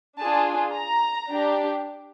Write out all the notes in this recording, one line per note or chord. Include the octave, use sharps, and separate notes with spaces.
D4 F4 G#4 A5
A#5
D4 G4